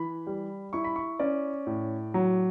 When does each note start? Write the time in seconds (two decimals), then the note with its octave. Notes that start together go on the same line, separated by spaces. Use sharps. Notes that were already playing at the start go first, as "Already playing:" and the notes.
Already playing: E3 B5
0.27 G3
0.73 E4 C#6
0.84 B5
0.96 C#6
1.20 C#4 D5
1.67 A2
2.14 F#3